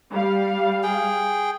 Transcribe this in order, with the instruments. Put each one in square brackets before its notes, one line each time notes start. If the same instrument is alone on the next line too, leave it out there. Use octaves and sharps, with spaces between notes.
[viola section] G3 F5
[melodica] G#4 G5